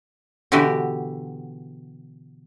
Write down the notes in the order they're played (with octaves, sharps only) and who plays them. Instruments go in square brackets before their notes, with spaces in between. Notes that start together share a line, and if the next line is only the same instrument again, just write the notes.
[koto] B2 D3 E3 F#4 G4